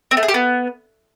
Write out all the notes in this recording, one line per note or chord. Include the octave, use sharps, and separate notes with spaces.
C4
A3
G#4
G4
B3